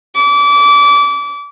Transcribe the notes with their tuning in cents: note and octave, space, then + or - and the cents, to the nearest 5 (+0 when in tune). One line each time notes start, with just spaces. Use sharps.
D6 -30